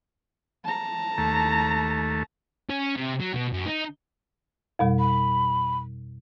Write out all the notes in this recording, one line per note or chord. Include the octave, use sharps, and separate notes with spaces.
A5 A#5
D#2 A3
C#4
C3
F#3
B2
F#2
D#4
F2 B2 G3
B5